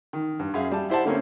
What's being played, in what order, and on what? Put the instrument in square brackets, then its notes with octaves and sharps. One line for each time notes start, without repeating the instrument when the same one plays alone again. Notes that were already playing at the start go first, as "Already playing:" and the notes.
[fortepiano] D#3
G2
F#2 G#4 E5 F5
G3 A5
E4 G4 C5 E5 F#5 A5
D3 A3 A#3 C4 C#4